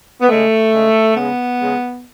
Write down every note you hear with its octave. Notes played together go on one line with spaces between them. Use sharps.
B3
C#3 G#3 A3
C#3 G#3
C#3 G#3 B3
C#3 G#3